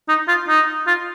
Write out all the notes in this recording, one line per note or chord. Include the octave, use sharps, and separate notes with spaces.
D#4
F4
D#4
F4